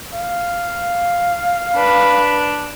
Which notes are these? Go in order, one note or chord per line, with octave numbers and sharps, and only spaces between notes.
F5
D4 B4